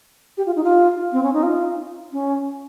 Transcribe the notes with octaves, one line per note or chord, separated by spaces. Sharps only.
G4
F4
D#4
F4
C4
C#4
D#4
F4
C#4